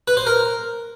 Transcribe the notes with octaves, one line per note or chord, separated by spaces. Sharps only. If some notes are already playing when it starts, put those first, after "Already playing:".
B4
C5
A#4